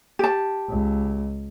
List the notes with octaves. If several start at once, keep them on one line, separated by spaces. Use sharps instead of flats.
G4 A5
C#2